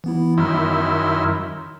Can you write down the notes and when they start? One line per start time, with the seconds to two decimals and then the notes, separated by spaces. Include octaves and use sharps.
0.04 E3 B3 E4
0.38 F#2 D#3 E4 C6 F6